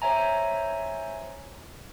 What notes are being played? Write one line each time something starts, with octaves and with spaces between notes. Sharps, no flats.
C5 C#5 E5 G#5 A#5